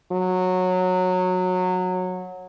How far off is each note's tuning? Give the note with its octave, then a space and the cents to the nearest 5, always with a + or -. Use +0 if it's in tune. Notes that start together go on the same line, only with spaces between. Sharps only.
F#3 -15